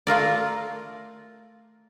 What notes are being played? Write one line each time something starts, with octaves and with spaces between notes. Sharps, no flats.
A3 F4 A#4 D5